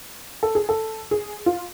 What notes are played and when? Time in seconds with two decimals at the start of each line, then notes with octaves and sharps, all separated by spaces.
0.43 A4
0.55 G#4
0.69 A4
1.11 G#4
1.46 F4